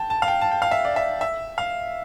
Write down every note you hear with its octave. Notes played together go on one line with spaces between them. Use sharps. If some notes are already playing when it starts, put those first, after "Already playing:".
Already playing: G5 A5
A5
F5
G5
A5
G5
F5
E5
D5
E5
E5
F5